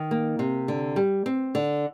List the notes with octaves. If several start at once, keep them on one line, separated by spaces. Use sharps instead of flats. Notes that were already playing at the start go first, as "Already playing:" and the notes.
Already playing: D#3
A#3
C3
D3
G3
C4
D3